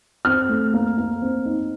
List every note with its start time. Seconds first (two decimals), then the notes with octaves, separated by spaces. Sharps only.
0.25 C4 F6
0.49 A3
0.74 A#3
0.97 A#3
1.22 C4
1.45 D#4